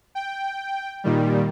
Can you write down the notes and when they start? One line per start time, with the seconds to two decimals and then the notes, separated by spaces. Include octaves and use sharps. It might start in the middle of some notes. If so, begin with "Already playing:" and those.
0.15 G5
1.04 A#2 D#3 G3